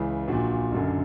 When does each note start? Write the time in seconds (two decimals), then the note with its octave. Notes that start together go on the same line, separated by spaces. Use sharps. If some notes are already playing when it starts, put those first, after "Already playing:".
Already playing: C#2 C#3 E3
0.28 A#1 A#2 F#4
0.72 F#1 F#2 D3